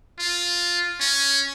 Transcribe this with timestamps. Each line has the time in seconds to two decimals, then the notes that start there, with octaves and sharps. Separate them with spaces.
0.19 F4
1.00 C#4